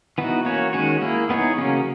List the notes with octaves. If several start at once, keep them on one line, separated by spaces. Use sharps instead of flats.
E3 B3 D#4 F#4
A#3 C#4 F#4 C#5
D#3 G#3 C#4 F#4 C#5
A#3 E4 G#4
E3 B3 D#4 G#4 C#5
C#3 F#3 A#3 C#4